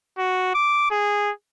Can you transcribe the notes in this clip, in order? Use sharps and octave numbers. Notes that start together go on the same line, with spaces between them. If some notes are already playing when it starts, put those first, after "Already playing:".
F#4
D6
G#4